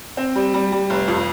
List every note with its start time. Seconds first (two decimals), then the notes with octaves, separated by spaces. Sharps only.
0.17 C4
0.35 G3
0.54 G3
0.72 G3
0.90 F1
1.08 F2